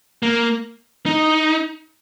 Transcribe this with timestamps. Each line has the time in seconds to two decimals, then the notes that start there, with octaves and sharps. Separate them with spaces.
0.23 A#3
1.06 D#4